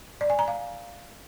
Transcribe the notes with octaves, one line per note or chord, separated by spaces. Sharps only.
D5
G#5
A#5
F5